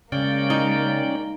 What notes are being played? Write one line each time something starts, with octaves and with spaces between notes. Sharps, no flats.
C#3 G#3 A#3 C#4 D5 G5
D#4